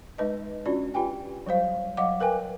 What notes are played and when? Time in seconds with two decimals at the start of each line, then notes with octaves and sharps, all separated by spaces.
0.18 G#3 D#4 B4 D#5
0.66 C#4 D4 F4 F#4 D5
0.94 F4 G4 B4 G5 G#5
1.46 F#3 G3 C5 F5
1.97 F#3 D#5 F5 F#5 D6
2.20 A#4 B4 G5 G#5